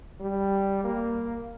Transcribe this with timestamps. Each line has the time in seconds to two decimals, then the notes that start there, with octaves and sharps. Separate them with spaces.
0.20 G3
0.84 A#3